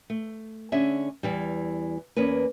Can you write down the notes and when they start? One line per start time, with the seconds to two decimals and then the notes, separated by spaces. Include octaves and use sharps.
0.10 A3
0.72 D3 C#4 D4 G#4 E5
1.23 E2 E3 G3
2.16 E2 A#3 C#4 B4